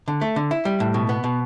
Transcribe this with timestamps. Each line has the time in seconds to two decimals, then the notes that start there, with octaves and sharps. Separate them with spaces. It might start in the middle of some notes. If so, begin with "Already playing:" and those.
0.08 D3
0.21 A3
0.36 D3
0.51 E4
0.65 G3
0.80 A2
0.94 B2
1.09 B3
1.24 B2